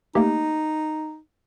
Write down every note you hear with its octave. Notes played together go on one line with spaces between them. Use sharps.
A3 A#3 D#4 G4